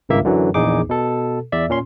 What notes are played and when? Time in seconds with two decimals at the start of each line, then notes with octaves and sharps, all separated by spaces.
0.09 G#1 C#2 G2 A#3 E5
0.24 F#2 D3 E3 F#3
0.54 A#1 E2 D#4 G#4 D6
0.89 B2 A4
1.52 E2 D5 E5 E6
1.70 A#2 C#4 C6